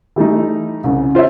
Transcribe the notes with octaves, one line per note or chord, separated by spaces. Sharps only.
E3 G3 A3 D#4
C2 C#3
F4 C5 C#5 E5